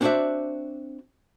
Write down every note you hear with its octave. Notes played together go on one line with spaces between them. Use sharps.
C4 D4 F#4 C5 D5 E5